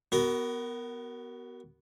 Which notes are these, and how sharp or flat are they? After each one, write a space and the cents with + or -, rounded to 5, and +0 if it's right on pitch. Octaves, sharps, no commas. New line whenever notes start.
B3 +0 F#4 +35 A#4 +0